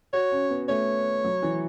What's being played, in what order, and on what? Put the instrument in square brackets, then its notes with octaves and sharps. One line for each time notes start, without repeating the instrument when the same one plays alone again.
[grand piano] F#4 [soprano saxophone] C#5
[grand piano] C#4
B3
[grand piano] A3 [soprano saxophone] C#5
[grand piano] F#3
E3